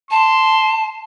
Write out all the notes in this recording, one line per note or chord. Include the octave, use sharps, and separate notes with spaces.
A5 C6